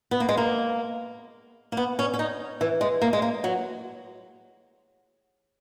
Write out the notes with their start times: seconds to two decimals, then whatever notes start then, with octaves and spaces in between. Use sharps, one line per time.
0.11 B3
0.20 A#3
0.29 G#3
0.37 A#3
1.72 A#3
1.77 B3
1.99 C#4
2.14 C#4
2.19 D#4
2.61 E3
2.81 G#3
3.02 A#3
3.13 G#3
3.22 A#3
3.44 F#3